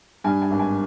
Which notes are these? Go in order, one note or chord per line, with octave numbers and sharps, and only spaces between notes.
G2 G#5
G#5
G#1
G#5